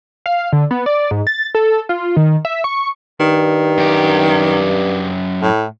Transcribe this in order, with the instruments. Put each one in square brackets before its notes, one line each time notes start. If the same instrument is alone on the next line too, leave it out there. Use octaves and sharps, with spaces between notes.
[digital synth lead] F5
D3
B3
D5
G#2
A6
A4
F4
D#3
E5
C#6
[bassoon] G2 [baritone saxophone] D#3
[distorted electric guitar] F#2 G4
[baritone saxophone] A2